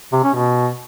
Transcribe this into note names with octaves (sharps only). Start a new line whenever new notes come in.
C3
C#4
B2